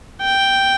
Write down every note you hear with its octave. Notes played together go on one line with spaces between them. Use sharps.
G5